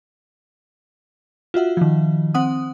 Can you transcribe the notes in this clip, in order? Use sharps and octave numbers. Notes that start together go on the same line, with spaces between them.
F4 F#4 E5 F#5
D#3 F3
C4 F#5 D#6